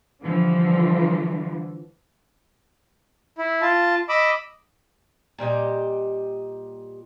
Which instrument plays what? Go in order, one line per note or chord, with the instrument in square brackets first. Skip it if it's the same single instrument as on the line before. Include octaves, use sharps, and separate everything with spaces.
[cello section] D3 E3 F3 G3
[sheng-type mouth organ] E4
F4 A5
D#5 B5 D6 E6
[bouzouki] A#2 G3 G4 D#5